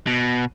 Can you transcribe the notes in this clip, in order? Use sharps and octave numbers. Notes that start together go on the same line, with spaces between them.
B2